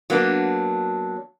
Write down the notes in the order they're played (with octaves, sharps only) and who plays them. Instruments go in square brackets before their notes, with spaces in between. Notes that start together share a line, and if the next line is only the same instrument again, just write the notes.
[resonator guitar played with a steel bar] F#3 A#3 B3 D4